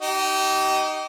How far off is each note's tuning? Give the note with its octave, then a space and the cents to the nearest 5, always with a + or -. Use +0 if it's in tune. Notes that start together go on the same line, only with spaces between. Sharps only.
D#4 +0 G4 -35